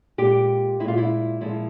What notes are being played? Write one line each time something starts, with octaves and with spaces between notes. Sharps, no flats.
A#2 G#3 G4
A#2 G#3 E4 F4
E4
A#2 F3 G#3 E4